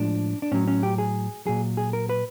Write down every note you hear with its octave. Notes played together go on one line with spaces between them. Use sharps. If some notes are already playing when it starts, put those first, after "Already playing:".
Already playing: A2 F3 G#3 D4
D4
A2 F#3 C#4
C#4
G4
G#4
A#2 F#3 G#4
G#4
A#4
B4